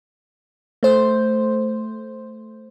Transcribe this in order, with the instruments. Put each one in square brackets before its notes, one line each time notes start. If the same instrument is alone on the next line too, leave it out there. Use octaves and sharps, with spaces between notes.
[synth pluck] A3 C5